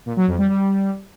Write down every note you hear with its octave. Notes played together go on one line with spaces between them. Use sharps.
A#2
F#3
F2
G3
G3